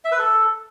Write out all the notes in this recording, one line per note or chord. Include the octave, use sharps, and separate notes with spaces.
E5
B4
A4